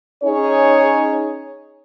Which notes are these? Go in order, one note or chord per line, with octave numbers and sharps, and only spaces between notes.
C#4 D#4 G#4 C#5